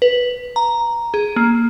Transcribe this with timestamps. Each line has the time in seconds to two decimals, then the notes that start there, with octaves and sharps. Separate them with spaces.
0.02 B4
0.56 A#5
1.14 G#4
1.36 A#3